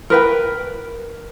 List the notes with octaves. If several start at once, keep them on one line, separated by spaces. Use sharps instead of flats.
A#4 B4 G5